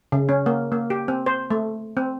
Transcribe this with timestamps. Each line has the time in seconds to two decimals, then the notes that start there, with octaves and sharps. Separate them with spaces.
0.12 C#3
0.29 C#4
0.46 A#3
0.72 A#3
0.90 G4
1.08 C4
1.26 C5
1.50 A3
1.97 C4